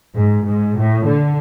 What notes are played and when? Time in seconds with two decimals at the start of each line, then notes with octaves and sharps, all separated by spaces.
0.14 G#2
0.44 G#2
0.76 A2
1.06 D3